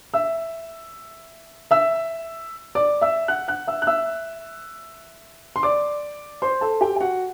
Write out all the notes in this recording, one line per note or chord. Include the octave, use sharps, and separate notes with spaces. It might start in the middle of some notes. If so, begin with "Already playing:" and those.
E5 E6
E5 E6
D5 D6
E5 E6
F#5 F#6
F#5 F#6
E5 E6
F#6
E5 E6
C6
D5 D6
C5 C6
A4 A5
G4 G5
G5
F#4 F#5